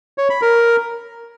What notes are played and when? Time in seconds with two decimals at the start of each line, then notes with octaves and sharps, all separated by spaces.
0.18 C#5
0.30 B5
0.42 A#4